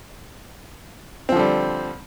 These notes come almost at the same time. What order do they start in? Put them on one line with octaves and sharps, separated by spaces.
C4 F3 D3 G3